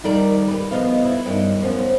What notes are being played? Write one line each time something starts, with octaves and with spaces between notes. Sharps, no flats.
F2 D#3 G3 A4 A#4 D5
G4 B4
B2 F3 B3 D#5 F5
E4
G2 D#3 G3 C#4
F#2 F3 A3 B3 C#4